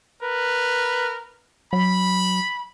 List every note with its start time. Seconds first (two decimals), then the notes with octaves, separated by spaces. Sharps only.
0.21 A#4 B4
1.73 F#3 B5